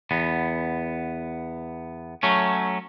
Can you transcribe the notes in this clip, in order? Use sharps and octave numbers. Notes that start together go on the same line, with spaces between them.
E2 B3
F#3 A3 C#4